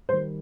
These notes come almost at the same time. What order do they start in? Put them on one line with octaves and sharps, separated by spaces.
G3 C5 D#3